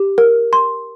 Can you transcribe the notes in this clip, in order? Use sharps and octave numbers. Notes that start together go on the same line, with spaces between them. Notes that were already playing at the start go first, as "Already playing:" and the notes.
Already playing: G4
A#4
C6